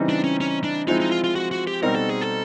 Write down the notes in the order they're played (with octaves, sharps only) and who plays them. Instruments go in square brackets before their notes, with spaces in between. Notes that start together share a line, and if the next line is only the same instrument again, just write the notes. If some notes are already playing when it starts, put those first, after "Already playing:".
Already playing: [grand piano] C#3 E3 G3 C4 D#4
[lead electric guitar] D4
C#4
C#4
D4
[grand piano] F3 G#3 C4 E4 [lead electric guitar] D#4
[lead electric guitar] D#4
F4
F4
F#4
F#4
G4
[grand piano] B2 G3 C4 D#4 [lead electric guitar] A#4
[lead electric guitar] A4
G#4
A4